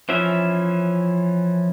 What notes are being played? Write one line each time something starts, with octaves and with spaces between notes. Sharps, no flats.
E3 F3 C#4 E5